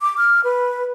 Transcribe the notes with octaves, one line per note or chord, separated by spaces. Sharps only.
D6
F6
B4